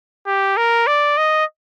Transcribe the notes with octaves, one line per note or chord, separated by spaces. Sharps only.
G4
A#4
D5
D#5